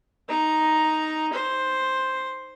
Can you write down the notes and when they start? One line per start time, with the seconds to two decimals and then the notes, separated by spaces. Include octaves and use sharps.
0.29 D#4 A#5
1.32 C5